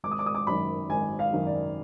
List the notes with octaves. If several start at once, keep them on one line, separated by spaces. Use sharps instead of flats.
G#1 D6
D#6
D6
D#6
D6
F#2 D#3 B5
G#1 G#5
F5
F#2 D#3
D5